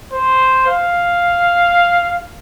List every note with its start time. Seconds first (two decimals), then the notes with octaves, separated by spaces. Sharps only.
0.12 C5
0.67 F5